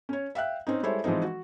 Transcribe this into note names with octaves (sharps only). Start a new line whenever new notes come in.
C#4 C#5
E5 F5 G5 F#6
C4 C#4 D#4
G3 G#3 E4 A4 C5 C#5
E3 F3 G#3 C4 D#4
F#4